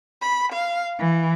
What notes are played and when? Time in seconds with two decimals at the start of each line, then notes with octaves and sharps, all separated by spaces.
0.20 B5
0.51 F5
0.98 E3